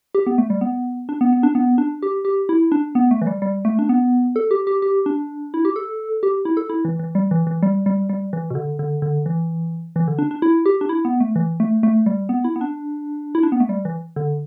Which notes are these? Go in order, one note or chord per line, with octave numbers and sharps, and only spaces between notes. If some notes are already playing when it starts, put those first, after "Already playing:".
G4
B3
A3
G3
B3
D4
B3
B3
D4
B3
D4
G4
G4
E4
D4
B3
A3
E3
G3
G3
A3
D4
B3
A4
G4
G4
G4
D4
E4
G4
A4
G4
E4
A4
E4
E3
E3
G3
E3
E3
G3
G3
G3
E3
B2
D3
D3
D3
E3
E3
D3
D4
D4
E4
G4
D4
E4
B3
A3
E3
A3
A3
G3
B3
E4
B3
D4
E4
D4
B3
A3
G3
E3
D3